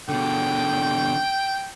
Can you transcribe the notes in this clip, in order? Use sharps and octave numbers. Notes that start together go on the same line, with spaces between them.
B2 D3 G5